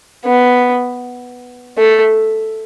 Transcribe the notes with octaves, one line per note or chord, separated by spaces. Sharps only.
B3
A3